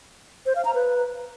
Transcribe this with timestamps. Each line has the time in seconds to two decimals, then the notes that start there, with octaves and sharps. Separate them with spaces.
0.46 C5
0.56 F5
0.65 A#5
0.74 B4